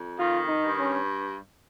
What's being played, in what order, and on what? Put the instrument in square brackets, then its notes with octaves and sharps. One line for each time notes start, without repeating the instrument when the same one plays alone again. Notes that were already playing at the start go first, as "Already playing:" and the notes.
Already playing: [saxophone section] F2
[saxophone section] D#3 [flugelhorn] F4
[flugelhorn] D#4
[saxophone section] G2
[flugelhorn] C#4